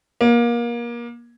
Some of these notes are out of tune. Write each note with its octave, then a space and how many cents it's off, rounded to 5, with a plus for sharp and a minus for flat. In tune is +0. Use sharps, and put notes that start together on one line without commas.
A#3 +30